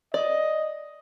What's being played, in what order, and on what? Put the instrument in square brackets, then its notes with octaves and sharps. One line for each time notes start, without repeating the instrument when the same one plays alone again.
[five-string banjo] D5 [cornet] D#5